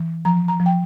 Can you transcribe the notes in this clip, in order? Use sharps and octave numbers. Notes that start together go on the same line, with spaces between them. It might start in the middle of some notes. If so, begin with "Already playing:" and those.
Already playing: E3
F3 A#5
A#5
F3
G5